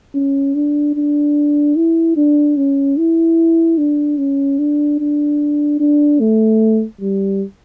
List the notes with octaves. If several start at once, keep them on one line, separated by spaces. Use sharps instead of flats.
C#4
D4
D4
E4
D4
C#4
E4
D4
C#4
D4
D4
D4
A3
G3